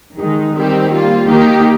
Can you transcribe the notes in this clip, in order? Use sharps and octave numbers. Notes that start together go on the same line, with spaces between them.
D#3 G#3 D#4
D#3 G3 C4 G4
G3 A#3 F4
D#3 A#3 D#4 G4